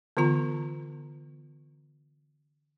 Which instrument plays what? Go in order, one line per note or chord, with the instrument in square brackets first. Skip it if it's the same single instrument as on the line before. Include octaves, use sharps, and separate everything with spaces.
[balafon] D3 E3 B3 F4 A#5